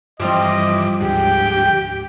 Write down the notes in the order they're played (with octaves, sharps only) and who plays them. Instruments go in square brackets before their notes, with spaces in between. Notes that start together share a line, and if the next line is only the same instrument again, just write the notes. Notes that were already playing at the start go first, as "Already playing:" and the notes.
[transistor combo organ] G2 E3 D6 [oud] F3 G3 C4 [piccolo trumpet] D#5
[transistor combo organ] D2 G#2 [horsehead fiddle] G4 [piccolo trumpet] G5